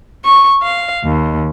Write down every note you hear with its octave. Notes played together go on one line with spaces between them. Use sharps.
C#6
F5
D#2